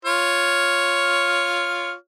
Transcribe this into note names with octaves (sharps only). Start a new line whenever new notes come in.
F4 C#5 F6